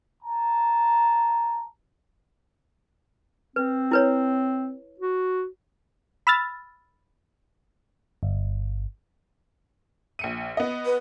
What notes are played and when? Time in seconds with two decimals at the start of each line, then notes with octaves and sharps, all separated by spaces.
0.22 A5 A#5
3.56 C4 B4
3.91 E4 B4 C#5
5.00 F#4
6.27 B5 E6 F6 A6
8.23 G1
10.19 A#1 C#7 D#7
10.57 B3 D#5
10.85 B4